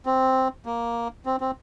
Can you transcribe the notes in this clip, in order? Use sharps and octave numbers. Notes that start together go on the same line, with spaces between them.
C4
A#3
C4
C4